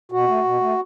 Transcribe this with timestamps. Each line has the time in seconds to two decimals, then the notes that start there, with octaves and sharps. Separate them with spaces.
0.12 B2 F#4
0.27 A3
0.44 B2
0.60 A3